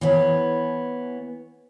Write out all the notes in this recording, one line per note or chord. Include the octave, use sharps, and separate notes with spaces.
E3 B3 C#5